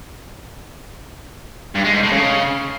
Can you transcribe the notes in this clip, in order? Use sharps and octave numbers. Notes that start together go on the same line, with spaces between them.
G2
G#3
G#2
A2
C#3